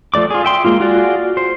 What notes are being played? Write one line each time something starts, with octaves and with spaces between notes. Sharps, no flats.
F3 A3 D5 D6
F4 G#4
E5 G5 C6
G#3 A#3 F4
F4 F#4 G#4 D5
C5